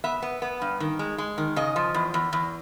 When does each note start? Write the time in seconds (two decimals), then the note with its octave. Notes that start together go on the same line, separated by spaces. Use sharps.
0.04 B3 E5
0.22 B3
0.42 B3
0.62 G2
0.80 D#3
0.99 G#3
1.18 G#3
1.38 D#3
1.56 C#3 D#5
1.76 F3
1.94 E2
2.14 E2
2.33 E2